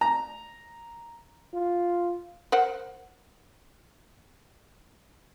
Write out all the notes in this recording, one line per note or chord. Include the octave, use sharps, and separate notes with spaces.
A#5
F4
A#4 C5 F#5